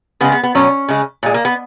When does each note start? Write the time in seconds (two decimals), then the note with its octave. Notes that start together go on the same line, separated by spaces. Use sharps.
0.21 C#3 B3
0.24 G#3
0.32 B3
0.43 B3
0.55 B2 F#3 C#4
0.88 C#3 G#3
1.23 A#2 G#3
1.34 A#3
1.45 B3